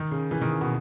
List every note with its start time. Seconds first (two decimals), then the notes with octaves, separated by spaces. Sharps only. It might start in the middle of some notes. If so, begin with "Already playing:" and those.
Already playing: D#3
0.11 C#3
0.31 E3
0.41 D#3
0.51 C#3
0.61 B2